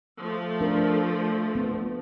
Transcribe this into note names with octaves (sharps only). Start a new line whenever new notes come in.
F3 A3
D4 A#4
B3